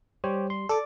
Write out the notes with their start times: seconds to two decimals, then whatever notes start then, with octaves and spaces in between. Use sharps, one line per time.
0.24 G3 G4 C5 C#5
0.50 C6
0.69 A4 D5 D6